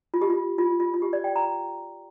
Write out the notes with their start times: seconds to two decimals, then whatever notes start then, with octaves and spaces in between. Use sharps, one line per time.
0.14 F4
0.22 G4
0.30 F4
0.58 F4
0.80 F4
0.94 F4
1.02 G4
1.13 D5
1.24 G5
1.36 A#5